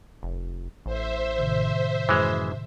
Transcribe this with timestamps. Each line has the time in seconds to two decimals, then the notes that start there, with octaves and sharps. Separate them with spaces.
0.23 F1
0.86 A1 C5 E5
1.38 A2 C3 D#3
2.09 F#2 E3 G#3